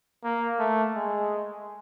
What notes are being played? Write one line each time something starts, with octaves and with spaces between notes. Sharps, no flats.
A#3
A3
G#3